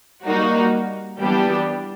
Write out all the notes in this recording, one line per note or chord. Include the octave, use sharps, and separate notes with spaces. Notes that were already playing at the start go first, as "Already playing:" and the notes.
G3 A#3 D#4 F#4
E3 G3 B3 D4 G4